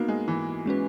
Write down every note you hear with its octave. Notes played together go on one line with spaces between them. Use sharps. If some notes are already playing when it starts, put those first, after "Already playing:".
Already playing: A#3 B3 D#4 F#4
G#3
E3
G#3 C#4 F#4 B4